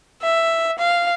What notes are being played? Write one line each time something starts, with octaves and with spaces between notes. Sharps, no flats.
E5
F5